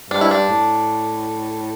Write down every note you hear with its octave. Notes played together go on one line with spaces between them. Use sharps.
G2 D4
E4
D4
A2